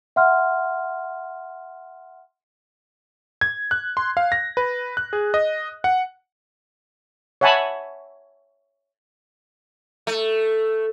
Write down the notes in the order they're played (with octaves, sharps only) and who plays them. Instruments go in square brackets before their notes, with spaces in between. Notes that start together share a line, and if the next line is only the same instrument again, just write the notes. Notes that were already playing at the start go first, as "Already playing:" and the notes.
[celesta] E5 F#5 C6 F6
[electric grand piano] G#6
F#6
C6
F5
A#6
B4
F#6
G#4
D#5
F#5
[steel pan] C#5 E5 F#5 G#5 A5 B5
[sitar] A3